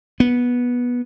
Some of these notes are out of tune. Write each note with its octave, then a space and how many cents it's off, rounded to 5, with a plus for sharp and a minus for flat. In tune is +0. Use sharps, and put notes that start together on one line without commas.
B3 -15